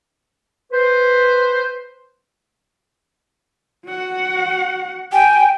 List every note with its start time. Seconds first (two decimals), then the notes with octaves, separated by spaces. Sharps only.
0.72 B4 C5
3.86 F#4 F#5
5.12 G4 G5 G#5